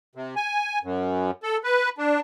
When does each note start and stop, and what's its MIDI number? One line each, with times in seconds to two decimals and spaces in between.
0.15 0.35 48
0.36 0.79 80
0.83 1.31 42
1.43 1.57 69
1.64 1.89 71
1.98 2.20 62